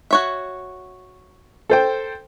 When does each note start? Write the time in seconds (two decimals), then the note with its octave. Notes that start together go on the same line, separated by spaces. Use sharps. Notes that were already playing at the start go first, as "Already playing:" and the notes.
0.11 F#4 C#5 E5
1.70 A4 C5 G5